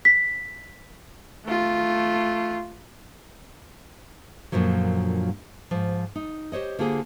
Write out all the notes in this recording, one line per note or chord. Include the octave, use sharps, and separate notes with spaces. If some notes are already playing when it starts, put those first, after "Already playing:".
B6
A3 F4
F#2 A#2 D3 F3 F#3
G#2 F3
D#4
G4 C5 C#5 D#5
D3 A#3 F4 G4 G#4 C5